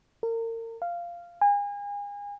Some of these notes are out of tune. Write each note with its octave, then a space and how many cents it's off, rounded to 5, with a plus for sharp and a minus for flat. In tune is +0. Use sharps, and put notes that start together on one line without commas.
A#4 -35
F5 -10
G#5 -35